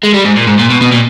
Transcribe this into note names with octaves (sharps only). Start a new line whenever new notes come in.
G#3
G3
G#2
A#2
G#2
A#2
B2
B2
A#2